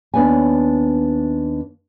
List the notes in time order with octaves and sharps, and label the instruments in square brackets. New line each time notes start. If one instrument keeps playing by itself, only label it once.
[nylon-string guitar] D#2 B3 D4 B4 C#5 G#5